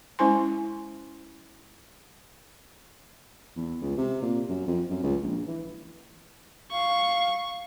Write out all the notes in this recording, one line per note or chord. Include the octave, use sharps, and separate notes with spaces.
G#3 C#4 E4 C5 G#5 C6
E2
C#2
C3
A#2
F#2
F2
F#2
C#2
A#1
E3
F5 C#6